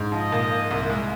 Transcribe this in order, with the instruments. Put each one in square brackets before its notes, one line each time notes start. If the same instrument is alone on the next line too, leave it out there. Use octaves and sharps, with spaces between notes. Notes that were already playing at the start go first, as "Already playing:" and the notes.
Already playing: [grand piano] G#2
[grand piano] F3 [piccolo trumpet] D#5
[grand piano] A#2
A#3
C2
G#3